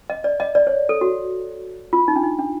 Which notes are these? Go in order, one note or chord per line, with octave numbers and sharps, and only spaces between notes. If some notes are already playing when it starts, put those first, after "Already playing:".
D#5
D5
D#5
D5
C#5
A4
F#4
F4
D#4
D4
D#4
D4